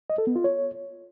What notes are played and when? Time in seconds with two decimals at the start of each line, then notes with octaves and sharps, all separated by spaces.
0.10 D#5
0.18 A4
0.27 B3
0.36 F4
0.44 C#5